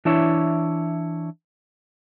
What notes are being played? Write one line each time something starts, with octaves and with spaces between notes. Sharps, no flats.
E3 D4 E4 C#5